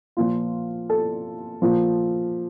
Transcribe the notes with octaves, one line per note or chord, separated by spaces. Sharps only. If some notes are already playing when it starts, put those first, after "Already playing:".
A#2 F3 F4
A4
A#2 F3